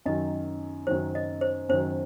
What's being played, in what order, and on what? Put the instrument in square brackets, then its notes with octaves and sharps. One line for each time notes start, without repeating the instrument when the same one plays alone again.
[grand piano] F#2 D#3 F#3 [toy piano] D#5
[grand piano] F#2 D#3 F#3 [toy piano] C5
[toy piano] D#5
C5
[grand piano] F#2 D#3 F#3 [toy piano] C5